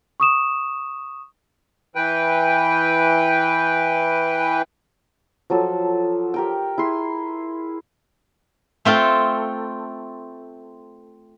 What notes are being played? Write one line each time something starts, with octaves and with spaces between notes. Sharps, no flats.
C#6 D#6 E7
E3 B4 G5
F3 F#3 A4
G4 A#4 G5
E4 G#4 C6
A3 C4 F4 A4